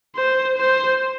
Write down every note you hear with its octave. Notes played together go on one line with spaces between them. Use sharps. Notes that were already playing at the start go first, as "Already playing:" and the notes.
C5
C5